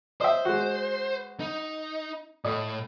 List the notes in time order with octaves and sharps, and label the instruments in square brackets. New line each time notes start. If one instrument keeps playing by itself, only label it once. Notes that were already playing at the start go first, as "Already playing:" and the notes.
[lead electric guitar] C5 [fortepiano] D#5 E5
[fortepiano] G#3 F#4
[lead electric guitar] D#4
[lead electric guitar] A2 [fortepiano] D#5